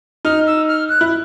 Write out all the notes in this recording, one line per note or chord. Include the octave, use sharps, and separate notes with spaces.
D#4 F6
E6
F6
F#6
E4